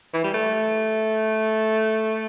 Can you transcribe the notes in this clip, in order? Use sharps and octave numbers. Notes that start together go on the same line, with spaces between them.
E3
G3
A3